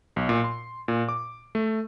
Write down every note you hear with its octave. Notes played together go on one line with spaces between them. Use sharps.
B1
A#2
C6
A#2
D6
A3